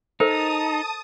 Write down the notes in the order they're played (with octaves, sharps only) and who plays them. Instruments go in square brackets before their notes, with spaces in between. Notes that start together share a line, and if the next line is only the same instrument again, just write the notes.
[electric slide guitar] D#4 [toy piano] A4 A#4 C5 [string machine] A5 D#6